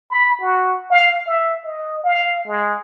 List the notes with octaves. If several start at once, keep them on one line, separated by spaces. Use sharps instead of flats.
B5
F#4
F5
E5
D#5
F5
G#3